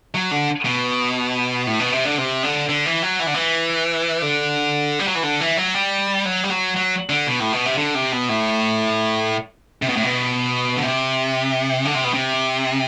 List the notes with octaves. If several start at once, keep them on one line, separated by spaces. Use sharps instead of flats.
F#3
D3
B2
A2
B2
C3
D3
C3
D3
D3
E3
F#3
E3
D3
E3
D3
G3
F#3
E3
D3
E3
F#3
G3
F#3
G3
F#3
F#3
D3
B2
A2
B2
C3
D3
C3
B2
A2
C3
B2
A2
B2
D3
C3
D3
C3
B2
C3